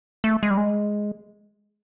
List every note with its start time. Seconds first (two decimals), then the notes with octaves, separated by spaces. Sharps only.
0.24 A3
0.43 G#3
0.50 G3
0.58 G#3